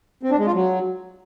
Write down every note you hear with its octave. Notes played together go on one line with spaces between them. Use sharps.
C4
D4
G#3
F4
F#3